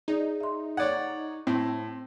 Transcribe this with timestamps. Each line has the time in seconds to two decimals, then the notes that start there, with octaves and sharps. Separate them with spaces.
0.08 D#4 G#4 D5
0.41 E5 C6
0.77 C#5 D5 F#5 F#6 G#6
1.47 A2 C4